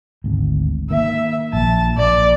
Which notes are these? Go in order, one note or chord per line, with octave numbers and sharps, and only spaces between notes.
G#1 D2
D#3 A#3 E5
A#1 A5
A#1 D5